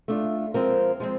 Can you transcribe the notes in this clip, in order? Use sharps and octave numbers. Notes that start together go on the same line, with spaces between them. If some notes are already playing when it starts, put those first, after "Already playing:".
A3 D4 F4
F3 G#3 C4 F4 A#4
F3 G#3 C4